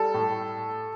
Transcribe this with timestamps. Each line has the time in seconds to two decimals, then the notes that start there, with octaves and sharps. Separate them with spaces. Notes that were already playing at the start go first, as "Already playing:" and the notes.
Already playing: G3 A4
0.14 A2